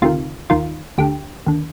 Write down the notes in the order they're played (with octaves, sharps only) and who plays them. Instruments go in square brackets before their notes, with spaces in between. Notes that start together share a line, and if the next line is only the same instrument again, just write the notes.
[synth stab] D2 C3 D#3 F4
D#2 D#3 F4
D2 D3 G4
D#2 D3